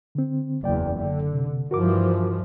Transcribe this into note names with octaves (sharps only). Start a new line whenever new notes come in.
D3 C4
F#1 E2 D5 G5
D3
C3
G2 E3 F3 F#4 A#4 D6